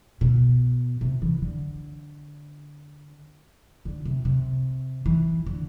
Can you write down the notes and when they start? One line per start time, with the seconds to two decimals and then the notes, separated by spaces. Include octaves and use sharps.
0.21 B2
1.01 C3
1.22 E3
1.42 D3
3.85 D3
4.05 C3
4.25 C3
5.06 E3
5.46 D3